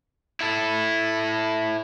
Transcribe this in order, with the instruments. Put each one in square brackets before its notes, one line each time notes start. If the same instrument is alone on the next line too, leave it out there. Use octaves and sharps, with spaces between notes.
[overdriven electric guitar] E4 A4